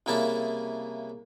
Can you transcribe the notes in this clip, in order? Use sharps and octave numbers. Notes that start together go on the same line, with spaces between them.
C2 C#3 A#3 E4 A5